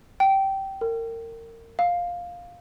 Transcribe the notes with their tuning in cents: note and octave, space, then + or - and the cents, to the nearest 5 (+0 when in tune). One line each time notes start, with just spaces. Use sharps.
G5 -15
A#4 -30
F5 +10